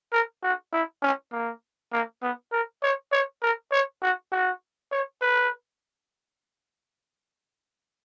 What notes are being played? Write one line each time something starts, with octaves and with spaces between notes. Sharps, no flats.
A#4
F#4
E4
C#4
A#3
A#3
B3
A#4
C#5
C#5
A#4
C#5
F#4
F#4
C#5
B4